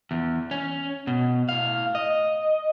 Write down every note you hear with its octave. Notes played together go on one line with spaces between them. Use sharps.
E2
C#4
B2
A2 F5
D#5